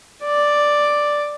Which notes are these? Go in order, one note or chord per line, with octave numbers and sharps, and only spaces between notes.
D5